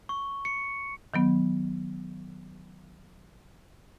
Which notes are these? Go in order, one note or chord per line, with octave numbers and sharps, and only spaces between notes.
C#6
C#7
D#3 F#3 B3